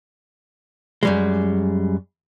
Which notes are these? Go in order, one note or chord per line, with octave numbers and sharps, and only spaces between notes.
F#2 G3 G#3